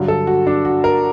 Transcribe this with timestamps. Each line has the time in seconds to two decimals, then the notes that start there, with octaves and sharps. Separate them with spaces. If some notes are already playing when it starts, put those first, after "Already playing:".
Already playing: G2 D3 F#3
0.08 A4
0.27 F#4
0.47 D4
0.65 F#4
0.84 A#4